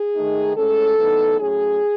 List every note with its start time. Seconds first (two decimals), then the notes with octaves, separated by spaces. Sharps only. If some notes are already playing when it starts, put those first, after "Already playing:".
Already playing: G#4
0.15 D#3 A3 D#4
0.56 A2 G#3 C#4 A4
0.97 A2 E3 B3 D#4
1.39 A2 F#3 C#4 G#4